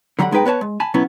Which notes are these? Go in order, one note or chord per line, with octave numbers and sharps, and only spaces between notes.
D3 F#3 G4 F#5 B5
B1 G#3 D#4 B4 G5
B3 B4 C#5 A5
G#3
G#5 A5 B5
B2 F#3 B3 C#4 E4